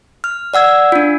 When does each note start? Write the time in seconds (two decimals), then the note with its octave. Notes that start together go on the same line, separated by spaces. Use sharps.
0.24 F6
0.54 D5 F#5 E6 G#6
0.92 D4 F4